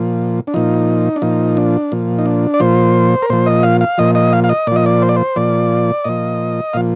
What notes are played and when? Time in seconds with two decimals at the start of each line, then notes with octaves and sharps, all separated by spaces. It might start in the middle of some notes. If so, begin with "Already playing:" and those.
Already playing: A#2 F3
0.47 D4
0.54 A#2 F3 D#4
1.16 D4
1.22 A#2 F3 D#4
1.57 D4
1.92 A#2 F3
2.19 D#4
2.26 D4
2.54 D5
2.60 A#2 F3 C5
3.22 A#4
3.30 A#2 F3 C5
3.46 D#5
3.63 F5
3.81 F5
3.98 A#2 F3 D#5
4.15 D#5
4.33 F5
4.44 F5
4.49 D#5
4.67 A#2 D5
4.72 F3 D#5
4.86 D5
5.02 C5
5.09 D5
5.16 C5
5.36 A#2 F3 D5
6.04 A#2 F3 D#5
6.73 A#2 F3 F5